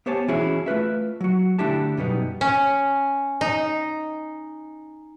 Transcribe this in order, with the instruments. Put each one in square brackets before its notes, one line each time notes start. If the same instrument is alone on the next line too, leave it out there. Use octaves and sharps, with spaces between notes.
[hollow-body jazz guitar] B3 G4 C5 C#5 G#5 A5
E3 C#4 E4 F#4 G#4 C#5
A3 F4 B4 E5
F#3 F#4
D3 A3 D4 E4 G4 A5
F#2 B2 G3 B3 D#4
[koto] C#4
D#4